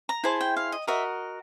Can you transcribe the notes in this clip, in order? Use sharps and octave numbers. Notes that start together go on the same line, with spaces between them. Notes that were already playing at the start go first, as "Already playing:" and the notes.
A#5
E4 G#4 C5 A5
G5
F5
D#5
F#4 A#4 D#5 E5